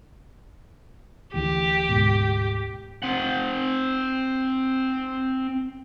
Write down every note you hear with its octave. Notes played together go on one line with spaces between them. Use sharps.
D2 E3 G4
D2 G#2 B2
C4 F#5